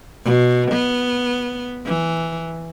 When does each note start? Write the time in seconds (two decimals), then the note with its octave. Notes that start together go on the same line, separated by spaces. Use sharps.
0.25 B2
0.71 B3
1.85 E3